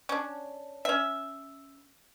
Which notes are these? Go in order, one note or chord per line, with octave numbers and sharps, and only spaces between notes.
C#4 D4
C#4 E5